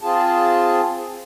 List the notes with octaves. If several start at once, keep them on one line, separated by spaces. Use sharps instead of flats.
C4 F4 G#4 A5